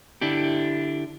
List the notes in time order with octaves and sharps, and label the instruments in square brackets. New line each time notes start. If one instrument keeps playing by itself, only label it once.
[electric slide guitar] D3 D4 E4 G4